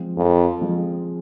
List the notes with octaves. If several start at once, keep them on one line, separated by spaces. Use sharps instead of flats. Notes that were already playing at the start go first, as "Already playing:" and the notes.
Already playing: F3 G#3 C4 F4 G#4
F2
F3 G#3 C4 F4 G#4